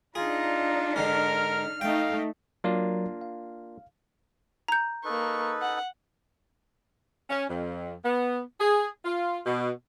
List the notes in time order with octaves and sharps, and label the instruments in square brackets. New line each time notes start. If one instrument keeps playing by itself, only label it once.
[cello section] D4 D#4 [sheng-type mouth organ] F4 [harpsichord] G#4 [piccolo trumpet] A#5
[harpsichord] G#2 D3 G#3 [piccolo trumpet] A#4 [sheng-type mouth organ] F6
[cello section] A3 D#4 [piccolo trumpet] F5 [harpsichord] G5
[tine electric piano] F#3 A#4 D5 [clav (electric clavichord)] A#3 D4 F4
[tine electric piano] F5
[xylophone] A#5 G6
[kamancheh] A#3 C#6 [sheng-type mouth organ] D#4 A4 B4
[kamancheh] F#5
[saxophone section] C#4
F2
B3
G#4
F4
B2